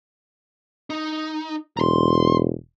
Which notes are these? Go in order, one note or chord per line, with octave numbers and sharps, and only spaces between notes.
D#4
E1 A#5 C6